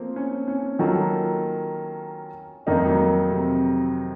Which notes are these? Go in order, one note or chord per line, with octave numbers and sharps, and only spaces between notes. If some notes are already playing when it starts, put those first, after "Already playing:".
Already playing: F3 A3 A#3 C4
C#4
C#4
D#3 F#3 A#3 F4 A4
F2 D#3 A3 A#3 D#4
F#3
A3
C3